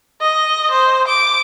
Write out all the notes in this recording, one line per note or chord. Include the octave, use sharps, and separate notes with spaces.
D#5
C5
D6